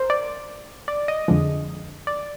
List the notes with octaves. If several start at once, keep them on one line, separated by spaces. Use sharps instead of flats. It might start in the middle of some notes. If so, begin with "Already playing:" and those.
Already playing: A#4 C5
D5
D5
D#5
F2 D3 F3 G#3
D5